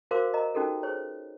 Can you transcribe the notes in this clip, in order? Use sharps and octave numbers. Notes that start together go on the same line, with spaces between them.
F#4 A#4 C5 F5 D6
A#4 D#5 A#5
C#4 D#4 F#4 G4 A4 A#4
G#4 C5 C#5